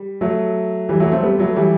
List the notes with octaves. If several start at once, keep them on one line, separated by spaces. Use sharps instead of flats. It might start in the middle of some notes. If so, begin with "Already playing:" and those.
Already playing: G3
F#3 A3
E3 G3
F#3 A3
A3 C4
G3 B3
F#3 A3
E3 G3